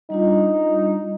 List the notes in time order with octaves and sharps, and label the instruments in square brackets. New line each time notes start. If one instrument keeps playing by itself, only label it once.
[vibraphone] G3 D4 F4 [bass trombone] D#4